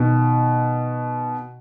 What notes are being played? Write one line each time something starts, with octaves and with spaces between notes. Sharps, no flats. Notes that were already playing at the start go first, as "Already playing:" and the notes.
Already playing: B2 D#3